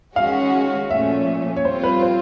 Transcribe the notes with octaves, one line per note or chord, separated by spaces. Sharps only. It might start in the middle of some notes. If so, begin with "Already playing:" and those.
D#3 G#3 C#4 F#4 F5
A#2 F3 A3 C#4 E5
C#5
G3 C4 F4 C5
B4
C5